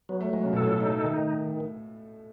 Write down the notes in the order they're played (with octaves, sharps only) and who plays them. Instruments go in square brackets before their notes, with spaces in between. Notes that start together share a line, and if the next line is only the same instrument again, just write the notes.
[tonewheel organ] F#3 [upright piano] B3
[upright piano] A3
[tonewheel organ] F#3 [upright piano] G#3
[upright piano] C#3
B2
[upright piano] A2 [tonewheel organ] A4
[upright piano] B2
[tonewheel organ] D#4
[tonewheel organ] D#3 [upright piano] A3